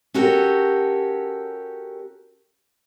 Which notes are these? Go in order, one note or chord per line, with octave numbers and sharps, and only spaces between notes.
C#4 F#4 G4 A4 A#4 C#5